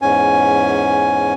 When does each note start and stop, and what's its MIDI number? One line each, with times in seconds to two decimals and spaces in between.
0.02 1.34 40
0.02 1.34 44
0.02 1.34 61
0.02 1.34 80